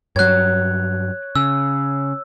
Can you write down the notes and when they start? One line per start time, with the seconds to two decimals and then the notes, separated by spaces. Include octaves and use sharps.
0.16 G2 F#3 C#5 F#6 G#6
1.36 C#3 E6